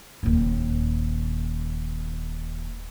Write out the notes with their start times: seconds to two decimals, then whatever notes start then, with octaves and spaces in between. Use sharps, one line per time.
0.23 D#1 D#2